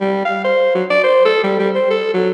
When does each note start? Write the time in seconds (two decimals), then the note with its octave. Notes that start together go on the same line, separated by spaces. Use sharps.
0.01 G3
0.25 F5
0.45 C5
0.75 F#3
0.90 D5
1.03 C5
1.25 A4
1.44 G3
1.59 G3
1.75 C5
1.90 A4
2.14 F#3